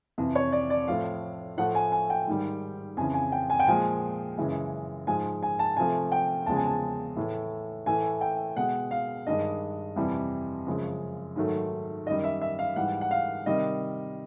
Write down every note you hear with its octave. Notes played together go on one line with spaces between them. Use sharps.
F2 C3 E3
C#5
D5
D5
A2 F3 A3 F5
A2 F3 A3 F#5
G#5
G#5
G5
G#2 D#3 G3
F2 C#3 E3 G#5
G#5
G5
G#5
G5
A#2 F3 G#3 G#5
F#2 C#3 E3 G#3
G#2 F3 G#3 G#5
G#5
A5
C3 F3 A3 G#5
G5
E2 C#3 F3 G#3 A5
G#5
A5
A2 E3 A3
A2 E3 A3 G#5
G5
B2 G#3 F#5
F5
G2 D#3 G#3 D#5
F2 C3 E3 G3
F#2 C#3 F3 G#3
G#2 D#3 F#3 A3
F#2 D#3 G3 D#5
E5
E5
F5
G#2 E3 G3 F#5
F#5
F5
C3 D#3 G3 D#5